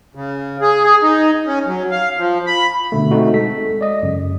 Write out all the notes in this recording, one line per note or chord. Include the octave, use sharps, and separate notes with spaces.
C#3
G#4
G#4
D#4
C#4
F#3
F5
F3
B5
B2 D3 A3
A3 C4 D#4 F#4
G#3 A4 B6
D5 D#5
F#2 C#3